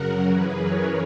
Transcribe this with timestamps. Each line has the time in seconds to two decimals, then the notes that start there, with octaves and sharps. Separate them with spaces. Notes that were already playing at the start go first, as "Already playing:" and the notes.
Already playing: F#2 C#3 F#3 F#4 A#4
0.29 F#2 E3 G#4 B4
0.58 A#4 C#5